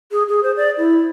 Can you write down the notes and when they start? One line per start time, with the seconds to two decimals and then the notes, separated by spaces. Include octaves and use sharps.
0.12 G#4
0.28 G#4
0.43 C5
0.57 D5
0.78 E4